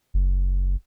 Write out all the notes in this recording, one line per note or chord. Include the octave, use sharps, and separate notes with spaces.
F#1